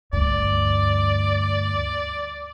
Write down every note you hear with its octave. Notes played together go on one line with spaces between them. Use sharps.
D2 G2 D5